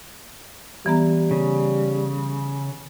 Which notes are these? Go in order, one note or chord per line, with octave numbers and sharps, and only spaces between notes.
E3 G3 B3 A#5
C#3